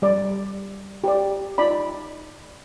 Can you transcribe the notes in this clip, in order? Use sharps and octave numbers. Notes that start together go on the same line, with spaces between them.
G3 D5
G4 C5 D5
D#4 F4 D5 B5